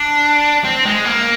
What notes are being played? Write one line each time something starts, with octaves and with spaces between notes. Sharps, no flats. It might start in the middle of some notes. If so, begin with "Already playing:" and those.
Already playing: D4
C4
G#3
A#3